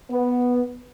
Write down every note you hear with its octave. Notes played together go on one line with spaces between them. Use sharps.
B3